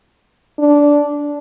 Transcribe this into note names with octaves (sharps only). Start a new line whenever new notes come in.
D4